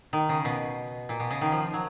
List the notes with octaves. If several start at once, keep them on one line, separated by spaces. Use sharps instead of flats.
D#3
C#3
B2
A#2
B2
C#3
D#3
F3
F#3